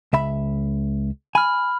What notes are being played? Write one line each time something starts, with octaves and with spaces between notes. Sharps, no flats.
C#2 E5 B5
G#5 B5 F6